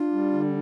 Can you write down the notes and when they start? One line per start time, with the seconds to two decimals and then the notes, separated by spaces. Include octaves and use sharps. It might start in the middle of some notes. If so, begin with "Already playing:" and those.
Already playing: D4 F4
0.12 G3
0.33 D3